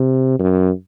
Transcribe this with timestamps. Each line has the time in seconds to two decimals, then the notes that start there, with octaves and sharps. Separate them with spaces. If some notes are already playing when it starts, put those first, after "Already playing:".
Already playing: C3
0.39 F#2